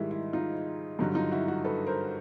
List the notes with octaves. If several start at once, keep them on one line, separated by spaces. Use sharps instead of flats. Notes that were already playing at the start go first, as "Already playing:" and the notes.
Already playing: G#2 D#3 G3 E4
E4
D#4 F4
G2 D3 F#3 D#4
D#4 F4
E4 F#4
E4 F#4
A4 B4
A#4 C5